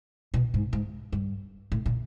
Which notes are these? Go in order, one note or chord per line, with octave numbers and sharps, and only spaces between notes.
B2
G#2
G#2
G2
A2
A#2